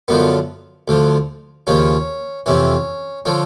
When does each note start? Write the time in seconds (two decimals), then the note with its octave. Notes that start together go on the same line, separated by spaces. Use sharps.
0.08 F#2 D3 F3 B3
0.88 D2 D3 F3
1.67 D#2 C#3 F3 C#4
2.46 F2 C3 E3 C#4
3.25 D3 F3 C#4